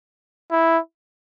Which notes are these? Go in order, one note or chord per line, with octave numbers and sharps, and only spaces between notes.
E4